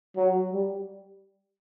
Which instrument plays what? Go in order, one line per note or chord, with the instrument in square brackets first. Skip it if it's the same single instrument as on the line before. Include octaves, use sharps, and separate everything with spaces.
[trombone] F#3
G3